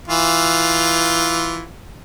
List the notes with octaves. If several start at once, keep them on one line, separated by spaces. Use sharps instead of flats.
E3 F4